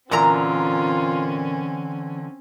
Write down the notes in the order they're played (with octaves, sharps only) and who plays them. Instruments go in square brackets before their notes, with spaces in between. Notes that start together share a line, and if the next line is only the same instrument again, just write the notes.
[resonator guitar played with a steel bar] A#2 A#4 A#5 [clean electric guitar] D3 E3 [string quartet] C4 C#4 [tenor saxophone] F4